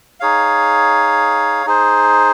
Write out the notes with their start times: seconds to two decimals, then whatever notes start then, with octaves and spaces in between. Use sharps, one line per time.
0.20 D#4 G#4 C#5 F5
1.66 D#4 G#4 C5